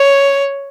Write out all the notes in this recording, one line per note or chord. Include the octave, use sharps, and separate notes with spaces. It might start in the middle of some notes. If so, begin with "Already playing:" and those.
Already playing: C#5